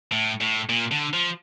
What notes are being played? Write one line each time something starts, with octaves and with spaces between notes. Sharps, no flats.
A2
A2
A#2
D3
F3